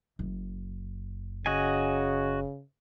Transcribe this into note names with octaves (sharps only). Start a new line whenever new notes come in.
F#1
C#3 F#4 D#5 G#5